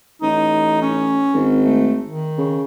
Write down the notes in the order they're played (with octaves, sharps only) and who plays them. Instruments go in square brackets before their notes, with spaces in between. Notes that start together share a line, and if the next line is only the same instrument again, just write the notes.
[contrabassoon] A1 [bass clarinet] D#4
[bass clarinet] C#4
[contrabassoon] G#1
[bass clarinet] A3
D#3
[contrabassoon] C#3